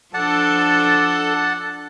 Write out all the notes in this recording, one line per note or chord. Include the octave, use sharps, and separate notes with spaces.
F3 D4 A4 D5 F#5 A5